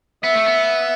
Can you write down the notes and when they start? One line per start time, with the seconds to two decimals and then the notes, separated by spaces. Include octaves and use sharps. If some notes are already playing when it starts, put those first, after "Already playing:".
0.24 B3 E5
0.35 A3
0.46 B3